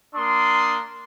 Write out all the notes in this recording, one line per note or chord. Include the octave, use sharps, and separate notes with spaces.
A#3 D4 C6 D#6